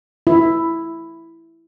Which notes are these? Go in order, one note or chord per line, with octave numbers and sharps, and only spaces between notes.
E4